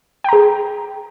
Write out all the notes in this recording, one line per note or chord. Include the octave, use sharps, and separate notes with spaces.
G#4 G5 A#5